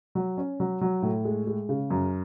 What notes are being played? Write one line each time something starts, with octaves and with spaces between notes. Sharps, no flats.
F#3
C#4
F#3
F#3
A2
G#3
G#3
C#3
F#2